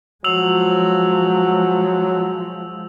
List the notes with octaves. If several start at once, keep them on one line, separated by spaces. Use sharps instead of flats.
F3 F#3 G#3 E6 F7 F#7